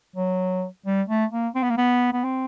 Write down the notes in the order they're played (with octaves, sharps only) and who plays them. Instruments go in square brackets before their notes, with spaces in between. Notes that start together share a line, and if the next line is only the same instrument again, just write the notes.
[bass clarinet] F#3
G3
A3
A#3
C4
B3
A#3
B3
B3
C4